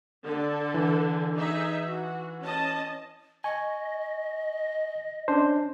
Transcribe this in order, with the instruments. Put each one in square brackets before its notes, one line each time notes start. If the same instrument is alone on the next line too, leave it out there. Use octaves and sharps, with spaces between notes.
[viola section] D3 A4
[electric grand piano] E3
[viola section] D#4 G#4 E5
F#4
C#4 D#5 A5
[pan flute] D#5 [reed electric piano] G#5 C#6
[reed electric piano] C#4 D4 C5